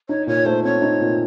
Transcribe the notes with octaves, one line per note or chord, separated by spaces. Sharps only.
D#4 C#5
A#2 C#5
A3 C5
C4 C#5
D#4
A#2